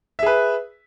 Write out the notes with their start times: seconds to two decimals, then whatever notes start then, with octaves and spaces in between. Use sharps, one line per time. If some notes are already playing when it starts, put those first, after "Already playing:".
0.19 E5
0.23 G#4
0.26 B4